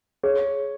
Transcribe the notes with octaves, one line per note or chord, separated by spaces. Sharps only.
G#4 C#5